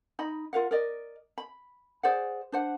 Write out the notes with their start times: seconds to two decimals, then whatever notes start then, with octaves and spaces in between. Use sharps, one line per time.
0.19 D#4 D#5 B5
0.53 F4 A#4 F5 F#5
0.71 A#4 D5 D#5
1.38 B5
2.03 G#4 C5 D5 F#5
2.52 D4 C5 F#5